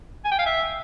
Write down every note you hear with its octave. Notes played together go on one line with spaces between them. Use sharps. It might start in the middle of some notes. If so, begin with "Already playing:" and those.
G#5
G5
F5
E5